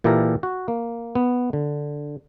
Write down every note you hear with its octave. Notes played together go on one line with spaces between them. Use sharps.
A#2 E3 G4 A4 A#4 A#5
F#4
A#3
B3
D3